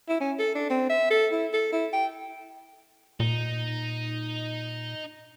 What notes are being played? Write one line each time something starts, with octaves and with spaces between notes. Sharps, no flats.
E4
C#4
A4
D4
C4
E5
A4
E4
A4
E4
G5
A#2 D#4